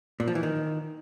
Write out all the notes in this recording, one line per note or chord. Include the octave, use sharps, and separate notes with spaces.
A#2
F3
E3
D#3